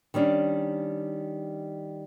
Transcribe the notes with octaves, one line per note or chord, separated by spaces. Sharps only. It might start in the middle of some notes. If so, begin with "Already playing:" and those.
D#3 G3 C#4 D4